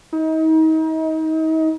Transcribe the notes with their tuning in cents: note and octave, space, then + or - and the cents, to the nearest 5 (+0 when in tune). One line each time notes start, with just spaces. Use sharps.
D#4 +35